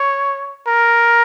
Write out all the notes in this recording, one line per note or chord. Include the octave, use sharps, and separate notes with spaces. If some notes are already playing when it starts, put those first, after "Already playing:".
Already playing: C#5
A#4